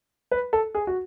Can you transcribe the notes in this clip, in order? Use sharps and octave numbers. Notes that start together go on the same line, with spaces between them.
B4
A4
G#4
F#4